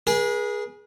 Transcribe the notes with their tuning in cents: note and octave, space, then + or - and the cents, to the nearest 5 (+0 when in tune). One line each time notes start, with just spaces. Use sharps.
G#4 +0 B4 -45